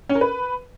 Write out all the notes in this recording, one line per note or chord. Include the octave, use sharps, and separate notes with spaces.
C#4
A#4
B4